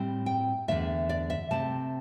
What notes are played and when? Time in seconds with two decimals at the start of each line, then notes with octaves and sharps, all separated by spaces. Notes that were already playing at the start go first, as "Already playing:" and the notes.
Already playing: A2 G3 C4
0.26 G5
0.68 E2 D3 A3 E5
1.09 D5
1.30 E5
1.51 C3 A3 C4 A5